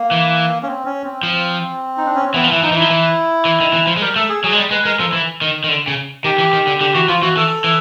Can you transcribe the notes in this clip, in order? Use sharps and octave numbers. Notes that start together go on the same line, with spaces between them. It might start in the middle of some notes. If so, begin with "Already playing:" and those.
Already playing: A#3
E3
C#4
C4
C#4
C4
F3
D#4
D4
C#4
C4
E3 B3
F3
E3 E4
F3 D#4
E3 E4
F3
E3
E3
D#3
E3
F3
G#3
G3 A#4
A3 A4
G#4
F#3 G#4
G#3
G3
G#3 B4
G#3 A#4
F3 A4
E3
D#3
D#3
D3
C#3
D#3 G4
E3
D#3
D3
D3 G4
E3 F#4
F3 F4
E3 F#4
E3 A4
E3